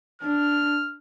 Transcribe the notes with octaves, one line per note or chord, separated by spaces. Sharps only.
D4 F6